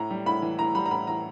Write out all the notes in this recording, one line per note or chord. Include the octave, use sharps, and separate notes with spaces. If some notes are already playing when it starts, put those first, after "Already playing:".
Already playing: A2 A#5
G3
A2 B5
E3
A2 A#5
G3 B5
A#5
A2 B5
E3 A#5